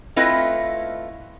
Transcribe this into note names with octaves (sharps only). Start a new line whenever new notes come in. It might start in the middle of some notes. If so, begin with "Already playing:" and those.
A3 C4 E4 F4 B4 D#5